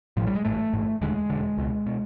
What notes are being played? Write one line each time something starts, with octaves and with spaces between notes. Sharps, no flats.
A1 A2 F3
G3
G#3
A1 G#2 A3
A1 G#2
E1 D#2 D3 G#3
E1 D#2 D3
C#2 B2
B2